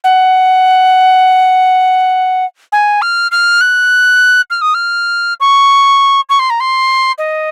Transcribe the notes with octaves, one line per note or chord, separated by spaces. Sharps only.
F#5
G#5
F6
F6
F#6
F6
D#6
F6
C#6
C#6
C6
A#5
C6
D#5